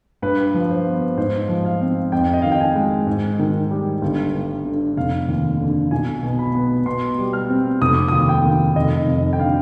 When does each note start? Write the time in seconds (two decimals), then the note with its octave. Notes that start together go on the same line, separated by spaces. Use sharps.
0.22 G2 B4
0.54 F3
0.71 C5
0.86 B3
1.17 G#2 C5
1.49 F3
1.65 F5
1.81 C4
2.12 F2 G5
2.34 D#5
2.42 D#3 F5
2.52 G5
2.60 G#5
2.76 G#3
3.07 G#2
3.39 D#3
3.71 G3
4.02 G1
4.34 G2
4.65 D3
4.97 F1 F5
5.29 D#2
5.60 D3
5.91 B1 G#5
6.23 B2
6.39 B5
6.55 B3
6.86 B2 C6
7.18 G3
7.33 F6
7.50 C4
7.81 F1 D#6
7.95 D6
8.08 D#2 D#6
8.29 G5
8.44 D#3
8.76 F1 D#5
9.07 F2
9.33 G5
9.39 D3 F5